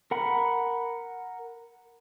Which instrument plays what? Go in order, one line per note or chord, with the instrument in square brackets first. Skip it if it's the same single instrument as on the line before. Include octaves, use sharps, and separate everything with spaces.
[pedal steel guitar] A#4 F#5 B5